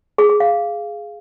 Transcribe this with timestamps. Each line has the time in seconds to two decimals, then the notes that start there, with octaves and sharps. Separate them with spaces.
0.18 G#4
0.29 G#4
0.40 F5